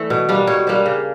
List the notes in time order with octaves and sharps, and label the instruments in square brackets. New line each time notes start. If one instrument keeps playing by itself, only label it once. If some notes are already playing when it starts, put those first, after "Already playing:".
Already playing: [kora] E3 A3 D5
B2
G3 A#3 D4
B2 C#5
G3 A#3 D4 C5
C#3